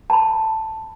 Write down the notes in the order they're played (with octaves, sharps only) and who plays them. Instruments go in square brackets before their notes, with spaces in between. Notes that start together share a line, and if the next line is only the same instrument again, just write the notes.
[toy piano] A5 B5